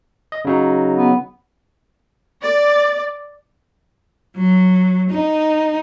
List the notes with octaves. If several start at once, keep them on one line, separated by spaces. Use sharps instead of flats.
D#5
C#3 F#3 D#4
B3
D5
F#3
D#4